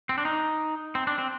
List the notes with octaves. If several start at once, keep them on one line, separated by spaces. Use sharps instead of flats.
C4
D4
D#4
C4
D4
C4